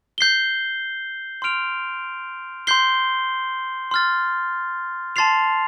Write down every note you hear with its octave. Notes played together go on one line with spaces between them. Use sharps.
G6 C7 G7
C6 F6 D7 F7
C6 G6 C7 G7
C6 F6 A6
A5 C6 A6 C7 F7